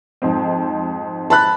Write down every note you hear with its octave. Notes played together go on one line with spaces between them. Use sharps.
F2 G#2 C4
A5 B5 F#6